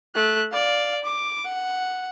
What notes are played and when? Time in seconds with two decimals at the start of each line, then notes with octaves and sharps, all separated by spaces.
0.15 A3 F#6
0.52 D5 F5
1.04 D6
1.45 F#5